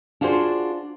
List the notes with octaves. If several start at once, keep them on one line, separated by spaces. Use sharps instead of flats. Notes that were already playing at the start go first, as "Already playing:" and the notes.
D4 F4 F#4 G#4 C5